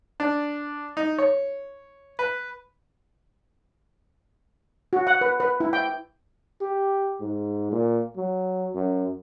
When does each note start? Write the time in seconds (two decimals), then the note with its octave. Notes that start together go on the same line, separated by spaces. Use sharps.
0.20 D4
0.97 D#4
1.18 C#5
2.19 B4
4.93 F#4
5.07 F#5
5.21 B4
5.40 B4
5.60 E4
5.73 G5
6.61 G4
7.21 G#2
7.72 A#2
8.17 F#3
8.75 F#2